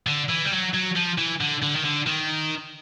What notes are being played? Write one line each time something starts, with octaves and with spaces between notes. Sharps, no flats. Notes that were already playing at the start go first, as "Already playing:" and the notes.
D3
E3
G3
F#3
F#3
F3
E3
D3
D3
D#3
D3
D#3